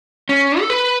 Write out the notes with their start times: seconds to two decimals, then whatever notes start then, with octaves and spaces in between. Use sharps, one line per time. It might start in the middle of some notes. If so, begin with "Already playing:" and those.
0.29 C#4
0.60 A4
0.70 B4